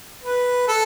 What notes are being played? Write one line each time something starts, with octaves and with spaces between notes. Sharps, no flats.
B4
A4